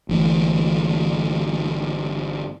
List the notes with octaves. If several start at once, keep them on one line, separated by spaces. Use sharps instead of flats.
G1 E3 A3